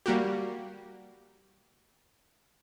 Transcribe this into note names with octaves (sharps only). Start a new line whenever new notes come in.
G3 A#3 F#4 G4